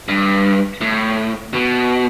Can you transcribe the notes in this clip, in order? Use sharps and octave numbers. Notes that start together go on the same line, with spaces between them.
G2
A2
B2